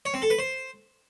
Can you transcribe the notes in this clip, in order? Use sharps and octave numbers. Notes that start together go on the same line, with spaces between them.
C#5
C4
A4
B4
C5